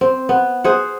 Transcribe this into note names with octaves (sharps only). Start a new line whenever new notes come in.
C4
B3
G#4 C5 F#5